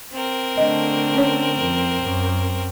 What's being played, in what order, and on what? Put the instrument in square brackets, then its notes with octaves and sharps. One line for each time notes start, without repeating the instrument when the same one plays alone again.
[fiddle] C4 A#4
[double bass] D3 A3 [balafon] D#5
[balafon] C#4 C#5
[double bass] F2
F#2